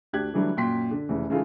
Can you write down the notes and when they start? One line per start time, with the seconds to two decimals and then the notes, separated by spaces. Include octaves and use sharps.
0.13 D2 D4 G4 F#6 G#6
0.34 D3 E3 F#3 G3 A3 D4
0.57 F#2 A#2 G5 C6 B6
0.91 D3
1.09 F1 C#3 E3
1.30 C#3 E3 G#3 D#4 F4 A4